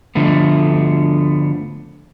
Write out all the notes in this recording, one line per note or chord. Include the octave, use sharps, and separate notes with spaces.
D3 F3 A3 B3